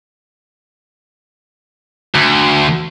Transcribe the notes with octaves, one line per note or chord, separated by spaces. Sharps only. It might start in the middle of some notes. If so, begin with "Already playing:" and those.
D2